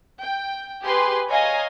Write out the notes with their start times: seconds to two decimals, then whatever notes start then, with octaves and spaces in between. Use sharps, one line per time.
0.20 G5
0.84 G4 G#4 B4 C6
1.30 C#5 D#5 F5 G#5 A#5